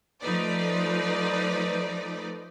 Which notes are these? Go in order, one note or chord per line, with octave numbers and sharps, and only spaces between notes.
F3 A3 D#4 B4 D5